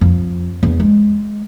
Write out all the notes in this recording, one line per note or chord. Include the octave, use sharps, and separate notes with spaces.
F2
E2
G#3